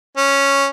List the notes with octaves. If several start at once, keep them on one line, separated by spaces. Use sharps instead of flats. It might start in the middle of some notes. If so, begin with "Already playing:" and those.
C#4